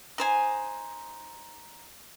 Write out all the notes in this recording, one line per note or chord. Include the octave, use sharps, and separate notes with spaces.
D#4 C5 G#5